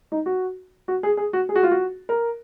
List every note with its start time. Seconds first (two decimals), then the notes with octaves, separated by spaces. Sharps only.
0.12 D#4
0.26 F#4
0.88 F#4
1.03 G#4
1.17 G#4
1.33 F#4
1.49 G#4
1.55 F#4
1.63 F4
1.71 F#4
2.09 A#4